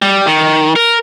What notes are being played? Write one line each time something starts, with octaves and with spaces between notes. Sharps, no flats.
G3
D#3
A#4